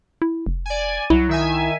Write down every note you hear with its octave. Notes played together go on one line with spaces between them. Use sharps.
E4
F1
D5 G#5
C2 F#3 E4
D#3 E5 G#5